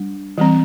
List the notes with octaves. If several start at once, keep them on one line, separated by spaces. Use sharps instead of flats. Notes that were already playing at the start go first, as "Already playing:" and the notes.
Already playing: G3 D4
E3 G3 C4